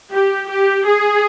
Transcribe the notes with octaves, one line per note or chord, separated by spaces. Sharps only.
G4
G4
G#4